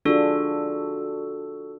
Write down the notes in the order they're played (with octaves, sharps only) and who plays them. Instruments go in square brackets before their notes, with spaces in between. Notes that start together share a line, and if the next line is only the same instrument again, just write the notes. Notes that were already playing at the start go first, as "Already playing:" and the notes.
[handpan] D4 F4 G#4 [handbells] F#4 A4